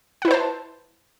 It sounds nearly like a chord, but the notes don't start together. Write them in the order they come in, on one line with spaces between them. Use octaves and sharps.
F#5 E4 B4 C5 A5